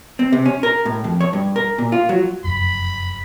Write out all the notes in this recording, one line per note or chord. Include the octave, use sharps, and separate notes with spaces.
C4
C3
C#4
A#4
A2
F2
C#5
G2
A#4
A#2
F4
F#3
F1 F#2 B5